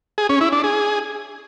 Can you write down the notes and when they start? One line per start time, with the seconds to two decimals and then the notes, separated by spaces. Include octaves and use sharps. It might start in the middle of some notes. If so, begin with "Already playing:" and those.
0.18 G#4
0.29 C#4
0.41 E4
0.52 D4
0.64 G#4